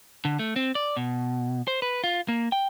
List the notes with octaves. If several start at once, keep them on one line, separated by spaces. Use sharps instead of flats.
D3
A3
C4
D5
B2
C5
B4
F4
A#3
G5